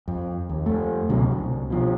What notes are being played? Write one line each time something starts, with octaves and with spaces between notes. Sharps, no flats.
F2
D#2
F2 A3
C#2 B2 D3 F#3
C2
B2 F3